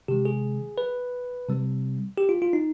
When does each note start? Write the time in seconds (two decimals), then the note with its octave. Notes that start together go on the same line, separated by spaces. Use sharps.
0.08 C3 D#3 G#3 G4
0.25 G#4
0.78 B4
1.48 C3 G3 C4
2.18 G4
2.29 F4
2.42 F4
2.53 D#4